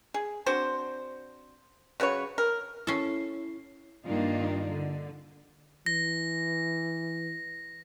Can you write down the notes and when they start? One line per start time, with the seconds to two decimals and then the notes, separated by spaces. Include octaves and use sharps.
0.14 G#4
0.46 C4 D4 F#4 C5
2.00 C#3 F#3 B4 C#5
2.38 A#4
2.87 C#4 E4 A4 C7
4.06 G2 D#3 A#3 D4 D#4 F4
4.72 D3
5.86 E3 A#6